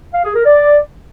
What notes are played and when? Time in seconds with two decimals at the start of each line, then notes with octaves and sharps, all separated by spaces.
0.13 F5
0.24 G#4
0.34 A#4
0.45 D5